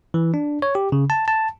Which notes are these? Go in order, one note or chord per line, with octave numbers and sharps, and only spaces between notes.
E3
D4
C#5
G4
C#3
A5
A5